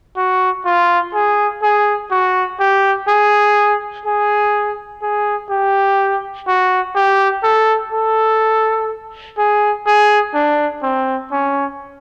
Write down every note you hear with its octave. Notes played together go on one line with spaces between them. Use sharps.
F#4
F4
G#4
G#4
F#4
G4
G#4
G#4
G#4
G4
F#4
G4
A4
A4
G#4
G#4
D4
C4
C#4